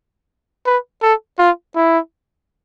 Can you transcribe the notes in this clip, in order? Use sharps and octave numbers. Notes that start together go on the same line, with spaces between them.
B4
A4
F4
E4